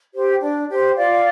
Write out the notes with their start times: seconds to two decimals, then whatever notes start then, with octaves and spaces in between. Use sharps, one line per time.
0.13 G4 C5
0.40 D4
0.68 G4 C5
0.97 F4 D5 F5